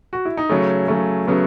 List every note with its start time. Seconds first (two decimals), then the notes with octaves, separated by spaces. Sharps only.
0.13 F#4
0.25 E4
0.37 D#4
0.49 C#3 F#3 A3 C#4
0.88 C#3 F#3 A3
1.28 C#3 F#3 A3 B3